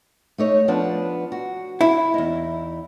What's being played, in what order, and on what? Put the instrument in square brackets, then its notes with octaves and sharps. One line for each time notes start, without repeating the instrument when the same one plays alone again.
[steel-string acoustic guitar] A3 D#4 C#5
F3 B3 D4
F#4
[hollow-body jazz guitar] E4
[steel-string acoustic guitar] E2 D#4